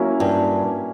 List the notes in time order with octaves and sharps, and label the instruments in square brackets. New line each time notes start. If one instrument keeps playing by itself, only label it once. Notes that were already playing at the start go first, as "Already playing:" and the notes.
Already playing: [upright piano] F#3 A#3 C#4 E4
[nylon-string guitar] G2